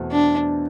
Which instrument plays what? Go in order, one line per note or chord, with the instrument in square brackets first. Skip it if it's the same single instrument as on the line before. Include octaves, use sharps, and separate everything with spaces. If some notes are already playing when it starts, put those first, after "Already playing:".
Already playing: [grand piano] E2 B2 A3 C4
[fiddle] D4